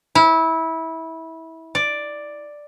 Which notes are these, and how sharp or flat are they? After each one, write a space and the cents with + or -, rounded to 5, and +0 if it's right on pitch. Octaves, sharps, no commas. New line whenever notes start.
E4 -20
D5 +5